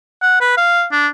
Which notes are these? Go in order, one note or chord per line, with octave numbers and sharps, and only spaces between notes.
F#5
B4
F5
D4